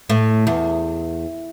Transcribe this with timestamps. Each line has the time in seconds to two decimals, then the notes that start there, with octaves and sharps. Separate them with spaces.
0.10 A2
0.47 E2